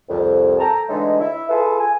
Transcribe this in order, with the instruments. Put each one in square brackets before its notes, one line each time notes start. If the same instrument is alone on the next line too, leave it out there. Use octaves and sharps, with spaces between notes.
[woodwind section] C2 F2
A4 G5 A5 A#5
D3 E3 F#3 G#3 A3 D#4
E4 E5
F4 G#4 A4 B4
G#5